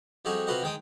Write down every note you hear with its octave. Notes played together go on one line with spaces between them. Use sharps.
F2 G3 D#4 F#4 G#4
C3 F4 F#4 B4 D#5 F#5
D#3 G#3 G5 D#6